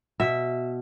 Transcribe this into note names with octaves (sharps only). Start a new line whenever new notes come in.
B2 E5